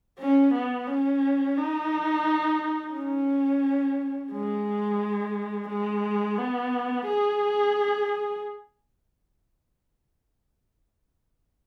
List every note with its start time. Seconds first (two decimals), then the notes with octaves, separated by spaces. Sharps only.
0.19 C#4
0.54 B3
0.87 C#4
1.57 D#4
2.94 C#4
4.32 G#3
5.69 G#3
6.38 B3
7.07 G#4